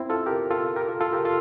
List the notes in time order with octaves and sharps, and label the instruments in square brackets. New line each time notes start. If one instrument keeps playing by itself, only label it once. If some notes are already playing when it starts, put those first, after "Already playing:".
Already playing: [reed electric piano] C4 E4
F4 A4
G4 A#4
F4 A4
G4 A#4
F4 A4
F4 A4
G4 A#4
F4 A4